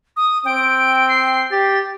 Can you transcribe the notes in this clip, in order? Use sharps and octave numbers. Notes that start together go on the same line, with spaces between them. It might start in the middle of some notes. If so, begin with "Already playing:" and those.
D#6
C4 G5 D7
C7
G4 A6